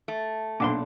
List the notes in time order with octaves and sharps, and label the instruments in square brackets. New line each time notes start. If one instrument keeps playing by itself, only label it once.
[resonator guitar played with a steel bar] A3
[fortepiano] B1 F#5 D6 [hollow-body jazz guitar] A#2 D4 C6